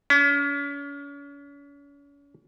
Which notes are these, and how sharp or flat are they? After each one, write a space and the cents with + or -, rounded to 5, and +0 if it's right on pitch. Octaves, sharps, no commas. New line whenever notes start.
C#4 +40